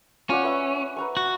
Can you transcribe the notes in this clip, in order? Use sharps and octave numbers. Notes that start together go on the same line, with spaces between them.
C#4 F4 D5 F#5
B4 E5 C#6
B4 A#5 C#6
F#4